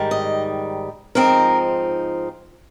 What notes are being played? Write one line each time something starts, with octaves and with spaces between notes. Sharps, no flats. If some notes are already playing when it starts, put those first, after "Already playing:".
Already playing: G#2 D#3 G3
D#5
G#2 F3 C4 D#4 A#4